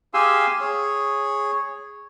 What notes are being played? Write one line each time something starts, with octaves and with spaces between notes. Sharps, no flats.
G4 G#4 F5 G#5 C6 E6
G#4 C#5